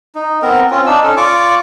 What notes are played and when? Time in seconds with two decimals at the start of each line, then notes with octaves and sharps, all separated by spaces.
0.15 D#4
0.42 B3 C4 A#4
0.70 C4 C#4 F4
0.86 D4 D#4 E6
1.03 C#4 A4
1.17 F4 D5 C#6 D6